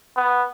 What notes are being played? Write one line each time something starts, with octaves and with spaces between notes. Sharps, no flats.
B3